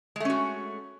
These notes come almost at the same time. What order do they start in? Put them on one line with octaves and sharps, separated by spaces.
G#3 A3 C#4 F#4